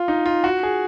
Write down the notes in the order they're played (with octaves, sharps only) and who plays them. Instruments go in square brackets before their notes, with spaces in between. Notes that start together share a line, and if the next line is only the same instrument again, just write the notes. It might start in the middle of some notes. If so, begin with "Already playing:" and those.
Already playing: [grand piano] F4
D#4
F4
F#4
G#4